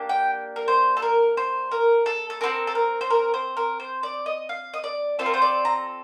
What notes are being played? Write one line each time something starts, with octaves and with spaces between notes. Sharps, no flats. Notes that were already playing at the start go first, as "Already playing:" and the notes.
Already playing: A#3 D4 G4
G5
A#4
C5
A4
A#4
C5
A#4
A4
A4
C4 F4 A4 A#4
A4
A#4
C5
A#4
C5
A#4
C5
D5
D#5
F5
D#5
D5
C4 F4 A4 C5
A#4
C5
D5
A#5